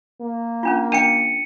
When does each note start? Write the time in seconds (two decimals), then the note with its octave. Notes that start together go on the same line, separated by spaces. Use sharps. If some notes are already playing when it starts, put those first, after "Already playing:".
0.21 A#3
0.63 C#4 D4 F4
0.92 D4 G5 C#7 D#7